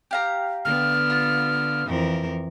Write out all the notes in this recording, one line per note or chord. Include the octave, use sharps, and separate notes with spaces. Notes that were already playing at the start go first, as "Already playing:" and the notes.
G4 F5 A#5
D3 B3 F6
F4
F2 E3 A#4